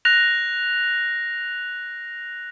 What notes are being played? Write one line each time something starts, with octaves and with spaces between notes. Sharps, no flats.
F#6 A#6 F7